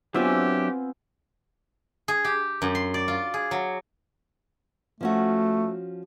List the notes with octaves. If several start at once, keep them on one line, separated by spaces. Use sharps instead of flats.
F#3 B3 C4 D4 F4 G4 E5 G#5
G#4
G4
F#2
C6
D5
F4
G#4
F#3
F3 A3 C#4 F#4